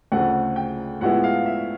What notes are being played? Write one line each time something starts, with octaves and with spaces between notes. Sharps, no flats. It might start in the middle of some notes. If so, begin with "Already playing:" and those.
D2 C#3 F3 A3 C4 F#5
G5
A2 F3 G#3 B3 E4 F#5
F5
E5